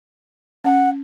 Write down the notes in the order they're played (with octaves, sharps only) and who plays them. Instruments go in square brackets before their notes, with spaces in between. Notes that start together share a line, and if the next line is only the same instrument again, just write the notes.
[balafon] C#4 A5 [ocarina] F#5